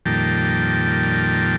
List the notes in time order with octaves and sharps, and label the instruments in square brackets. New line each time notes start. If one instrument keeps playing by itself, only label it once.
[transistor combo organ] F2 A#2 D#3 G3 G5 A5